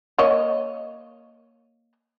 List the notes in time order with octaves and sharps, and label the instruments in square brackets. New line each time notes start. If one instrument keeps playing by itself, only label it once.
[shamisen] A#3 C#5 D#5